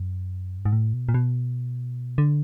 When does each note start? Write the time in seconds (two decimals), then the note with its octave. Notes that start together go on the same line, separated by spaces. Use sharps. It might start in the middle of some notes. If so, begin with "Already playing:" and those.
Already playing: F#2
0.59 G2
0.65 G#2
0.72 A2
0.94 B2
1.09 A#2
1.14 B2
2.18 D3